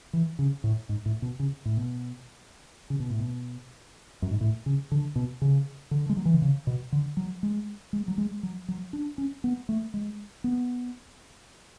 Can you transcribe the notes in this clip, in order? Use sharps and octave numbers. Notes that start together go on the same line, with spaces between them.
E3
C#3
A2
G#2
A2
B2
C#3
A2
B2
C#3
B2
A2
B2
F#2
G#2
A2
C#3
D3
B2
C#3
D3
G#3
F#3
E3
D3
C#3
B2
D3
F#3
G#3
G#3
F#3
G#3
F#3
F#3
D4
C#4
B3
A3
G#3
B3